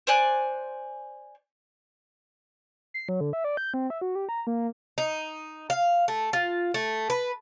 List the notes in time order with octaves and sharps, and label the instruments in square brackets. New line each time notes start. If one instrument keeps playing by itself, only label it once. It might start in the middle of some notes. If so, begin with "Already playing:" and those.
[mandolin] C5 D5 G#5 F#6
[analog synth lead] C7
F#3
D3
E5
D5
G6
C4
E5
F#4
G4
A#5
A#3
[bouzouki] D#4
F5
A3
F4
A3
B4